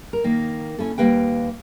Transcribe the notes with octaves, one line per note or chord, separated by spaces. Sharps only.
A#4
D#3 A#3
C#4 E4 A4
D#2 G3 A#3 B4 G5